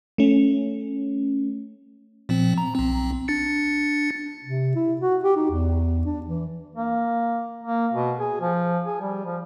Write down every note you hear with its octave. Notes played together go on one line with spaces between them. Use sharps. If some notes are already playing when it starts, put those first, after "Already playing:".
A3 C#4
A#2 F3 C4
A#5
B1 C4
D4 A6 C#7
C3
E4
F#4
G4
D#4
E2
D4
E3
A#3
A#3
B2
G#4
F3
G#4
G3
F3